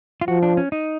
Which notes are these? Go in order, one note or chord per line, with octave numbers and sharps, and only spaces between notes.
F4
F3 F#4
D4
C#4
D#4